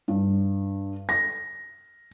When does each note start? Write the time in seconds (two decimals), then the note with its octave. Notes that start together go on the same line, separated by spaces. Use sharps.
0.08 G2
1.09 A#6